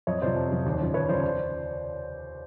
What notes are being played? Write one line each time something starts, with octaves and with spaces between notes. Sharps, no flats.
F2 C#5 D#5
C3 F3 C5 D5
F2
C3 F3
D#2
C#3 F3
D#2 B4 C#5
C#3 F3 C5 D5
C5 D5